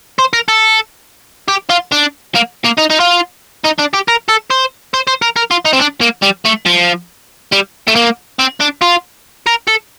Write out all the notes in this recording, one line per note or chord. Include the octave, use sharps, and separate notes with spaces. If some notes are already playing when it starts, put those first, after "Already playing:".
C5
A#4
A4
G4
F4
D4
A#3
A#3
D#4
D#4
F4
D#4
D4
G4
A#4
A4
C5
C5
C5
A#4
A#4
F4
D#4
C4
D4
A#3
G3
A3
F3
G3
A3
A#3
C4
D4
F4
A#4
A4